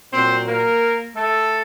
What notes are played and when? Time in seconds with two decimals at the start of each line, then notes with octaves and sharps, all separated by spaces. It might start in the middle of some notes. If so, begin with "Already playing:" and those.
0.12 A#2 F#3 C4 C5
0.46 A#3 A#4
1.15 A3 A4